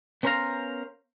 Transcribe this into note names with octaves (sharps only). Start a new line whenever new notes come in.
B3 C#4 A#4 C5 F5 A#5